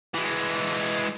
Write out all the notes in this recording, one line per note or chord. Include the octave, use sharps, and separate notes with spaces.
E3 G#3